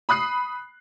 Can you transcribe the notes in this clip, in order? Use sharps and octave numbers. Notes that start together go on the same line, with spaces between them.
B5 D#6 F#6 C7